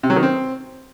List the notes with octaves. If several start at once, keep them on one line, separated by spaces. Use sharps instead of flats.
C3
F#3
D#3
C4